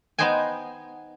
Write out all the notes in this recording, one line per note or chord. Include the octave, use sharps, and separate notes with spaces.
B3 D#4 C5 D#5 G5 G#5